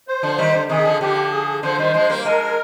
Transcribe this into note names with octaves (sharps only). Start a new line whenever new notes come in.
C5
D3 F3
D#3 G3
D3
C3 D#3 G#4
D3 F3
D3 F3 G4
G#4
D3 F3 C5
D#3 G3
F3 G#3
G3 A#3
F3 G#3 A#4